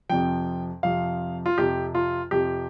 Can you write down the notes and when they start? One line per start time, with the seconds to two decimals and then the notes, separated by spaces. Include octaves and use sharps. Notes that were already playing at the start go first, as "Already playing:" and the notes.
0.09 F2 C3 F3 G5
0.83 F2 C3 F3 F5
1.46 F4
1.58 F2 C3 F3 G4
1.95 F4
2.31 F2 C3 F3 G4